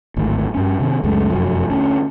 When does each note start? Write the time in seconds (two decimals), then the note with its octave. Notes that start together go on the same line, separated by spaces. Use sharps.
0.17 G#1 D2 A2
0.54 G2 C#4
0.79 C3 D#3 C4
1.04 C#2 F#2 G#3 A3
1.30 F1 F#2 F3 F#3
1.70 D2 A3 C#4